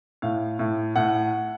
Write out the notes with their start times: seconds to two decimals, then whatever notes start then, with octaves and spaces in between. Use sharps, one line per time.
0.22 A2 F5
0.59 A2
0.96 A2 F#5